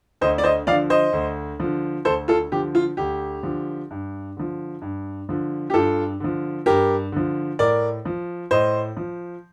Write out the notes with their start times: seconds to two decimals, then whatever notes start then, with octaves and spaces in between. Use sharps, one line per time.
0.21 D2 C5 D#5
0.38 D5
0.44 C5 D#5
0.67 F3 D5 F5
0.71 D3
0.90 C5 D#5
1.13 D2
1.60 D3 F3
2.05 D2 A4 C5
2.28 F4 A4
2.52 D3 F3 G4
2.75 F4
2.97 D2 G4
3.43 D3 F3
3.91 G2
4.37 D3 F3
4.82 G2
5.29 D3 F3
5.70 G4
5.74 G2 F4 A4
6.20 D3 F3
6.66 G2 G4 A#4
7.12 D3 F3
7.59 A2 A#4 D5
8.05 F3
8.51 A2 C5 D#5
8.97 F3